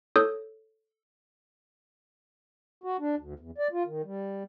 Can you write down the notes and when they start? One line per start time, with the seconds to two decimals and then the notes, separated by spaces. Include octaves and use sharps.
0.16 A4 C#5 D#6 E6 G6
2.84 F#4
3.00 D4
3.18 D2
3.39 E2
3.58 D5
3.72 F4
3.86 D#3
4.04 G3